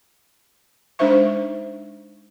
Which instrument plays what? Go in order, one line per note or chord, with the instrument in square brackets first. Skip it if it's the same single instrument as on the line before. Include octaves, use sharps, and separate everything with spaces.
[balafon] G#3 D4 D#4 C5 E5 C#6